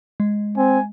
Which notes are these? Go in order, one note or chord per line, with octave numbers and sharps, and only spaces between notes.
G#3
C4 G#5